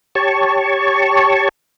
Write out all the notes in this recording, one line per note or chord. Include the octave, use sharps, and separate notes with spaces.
G4 C#5 A5 C#6